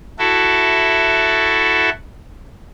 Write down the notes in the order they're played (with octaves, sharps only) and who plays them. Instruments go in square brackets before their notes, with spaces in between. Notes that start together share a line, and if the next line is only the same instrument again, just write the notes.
[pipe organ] E4 F#4 A4